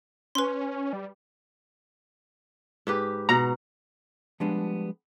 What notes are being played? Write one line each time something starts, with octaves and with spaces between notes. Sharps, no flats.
C#4 B4 C6
G3
G#2 G4 B4
B2 F#5 A#5
F3 G3 G#3 B3 D4